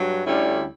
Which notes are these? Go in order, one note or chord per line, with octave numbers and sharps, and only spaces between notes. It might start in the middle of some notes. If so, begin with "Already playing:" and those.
Already playing: G2 F#3
D2 D3 G3 C#4 E4